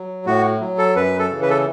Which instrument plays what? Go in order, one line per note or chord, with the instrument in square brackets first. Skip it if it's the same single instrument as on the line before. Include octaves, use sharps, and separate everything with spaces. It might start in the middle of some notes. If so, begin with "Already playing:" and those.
Already playing: [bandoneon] F#3
A2 F#4
F#3
A4
F#2 B4
A4
C#3 E3
B4
A4